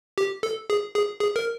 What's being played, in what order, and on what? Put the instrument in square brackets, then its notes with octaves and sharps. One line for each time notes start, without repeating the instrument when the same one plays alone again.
[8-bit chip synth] G4
A4
G#4
G#4
G#4
A#4